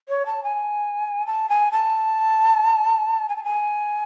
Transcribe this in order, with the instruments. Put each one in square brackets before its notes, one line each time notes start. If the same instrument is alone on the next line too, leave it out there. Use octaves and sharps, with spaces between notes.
[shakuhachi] C#5
A5
G#5
A5
G#5
A5
G#5
A5
G#5